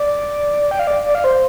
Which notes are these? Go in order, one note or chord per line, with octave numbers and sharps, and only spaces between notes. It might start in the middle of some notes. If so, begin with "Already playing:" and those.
Already playing: D5
G5
F5
D5
D5
F5
C5